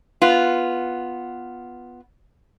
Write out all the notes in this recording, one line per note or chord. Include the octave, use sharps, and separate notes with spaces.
B3 F4